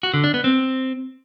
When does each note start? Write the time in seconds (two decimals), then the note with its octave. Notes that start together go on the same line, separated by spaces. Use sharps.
0.03 F#4
0.14 D3
0.24 D4
0.34 B3
0.44 C4